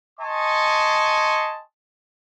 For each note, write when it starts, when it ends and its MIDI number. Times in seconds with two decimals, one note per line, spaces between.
0.20 1.60 75
0.20 1.60 80
0.20 1.60 81
0.20 1.60 84
0.20 1.60 85